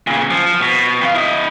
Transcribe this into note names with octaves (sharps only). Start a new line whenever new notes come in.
A#2 C#3
F3
B2
F2 F5
E4 D#5